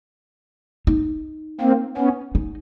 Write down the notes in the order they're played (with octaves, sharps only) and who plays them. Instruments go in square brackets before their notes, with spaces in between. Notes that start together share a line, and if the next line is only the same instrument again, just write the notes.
[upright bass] D#4
[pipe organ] A#3 C4
B3 C#4
[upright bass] D#4